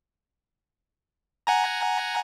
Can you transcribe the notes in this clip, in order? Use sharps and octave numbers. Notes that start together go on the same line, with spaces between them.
F#5 G#5 A#5